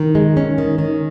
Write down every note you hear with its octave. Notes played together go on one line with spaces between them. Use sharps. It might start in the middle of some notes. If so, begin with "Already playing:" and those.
Already playing: D#3
G#3
C#4
D#3
D#3